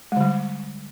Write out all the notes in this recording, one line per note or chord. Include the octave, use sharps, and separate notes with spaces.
D3 G3 G#3